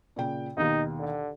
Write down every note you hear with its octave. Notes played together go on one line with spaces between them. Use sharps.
A#2 C#3 G5
D#2 B2 D#3 D#4
D3